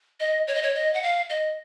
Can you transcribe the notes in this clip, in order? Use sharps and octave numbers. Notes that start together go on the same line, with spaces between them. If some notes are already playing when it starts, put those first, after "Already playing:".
D#5
C#5
D#5
C#5
D#5
F#5
F5
D#5